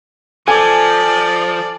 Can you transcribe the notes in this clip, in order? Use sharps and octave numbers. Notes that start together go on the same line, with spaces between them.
F3 A4 D5 G#5 A5 D6